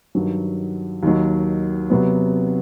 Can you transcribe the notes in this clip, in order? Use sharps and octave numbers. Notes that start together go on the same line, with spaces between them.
G2 D#3 F#3
D#2 D#3 F#3
C3 F#3 B3